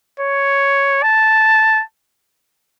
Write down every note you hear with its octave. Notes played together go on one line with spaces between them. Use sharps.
C#5
A5